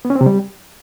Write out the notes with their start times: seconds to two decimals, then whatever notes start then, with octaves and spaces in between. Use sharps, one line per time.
0.05 B3
0.10 C#4
0.15 C4
0.21 C3
0.26 G3